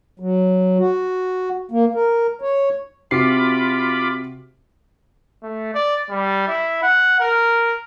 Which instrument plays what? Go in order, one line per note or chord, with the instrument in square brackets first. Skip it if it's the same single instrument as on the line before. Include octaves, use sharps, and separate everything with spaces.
[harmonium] F#3
F#4
A#3
A#4
C#5
[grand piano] C3 F#4 C7 [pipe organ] F4 B5 D6
[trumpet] A3
D5
G3
E4
F#5
A#4